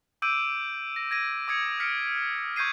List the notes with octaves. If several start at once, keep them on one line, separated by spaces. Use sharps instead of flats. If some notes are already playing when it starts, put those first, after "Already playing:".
D6 E6 G6 D7 D#7
A#6
G#6 A#6 D#7
D6 D#6 G#6 C#7
F6 B6 C#7 D7
C#6 G6 G#6 C7 D#7